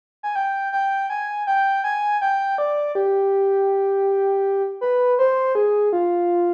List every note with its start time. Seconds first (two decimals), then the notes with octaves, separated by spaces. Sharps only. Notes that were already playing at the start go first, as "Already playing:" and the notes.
0.23 G#5
0.36 G5
0.72 G5
1.10 G#5
1.47 G5
1.84 G#5
2.22 G5
2.58 D5
2.95 G4
4.81 B4
5.19 C5
5.55 G#4
5.93 F4